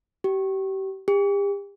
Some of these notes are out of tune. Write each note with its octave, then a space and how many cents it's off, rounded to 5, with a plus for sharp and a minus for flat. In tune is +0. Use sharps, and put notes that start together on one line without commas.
G4 -30
G4 +40